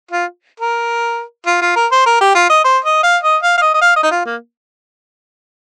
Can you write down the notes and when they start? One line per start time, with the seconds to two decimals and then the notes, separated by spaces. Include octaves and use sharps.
0.11 F4
0.60 A#4
1.47 F4
1.61 F4
1.76 A#4
1.92 C5
2.06 A#4
2.21 G4
2.35 F4
2.49 D#5
2.64 C5
2.84 D#5
3.03 F5
3.23 D#5
3.42 F5
3.58 F5
3.62 D#5
3.74 D#5
3.82 F5
3.96 D#5
4.03 D#4
4.11 F4
4.26 A#3